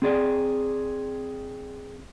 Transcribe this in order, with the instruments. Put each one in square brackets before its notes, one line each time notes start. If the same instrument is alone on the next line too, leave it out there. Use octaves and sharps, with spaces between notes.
[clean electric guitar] C4 G#4 D5